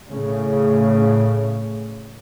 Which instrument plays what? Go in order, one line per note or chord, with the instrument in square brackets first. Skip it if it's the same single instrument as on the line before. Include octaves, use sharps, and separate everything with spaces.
[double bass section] A2 C#3